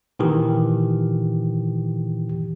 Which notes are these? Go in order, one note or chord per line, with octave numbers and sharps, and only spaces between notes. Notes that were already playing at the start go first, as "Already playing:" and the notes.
A#2 D#3 E3 G4